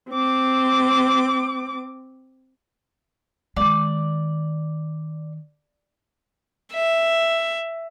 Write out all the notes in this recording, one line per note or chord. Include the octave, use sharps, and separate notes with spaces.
C4 D6
D#3 G#3 D5
E5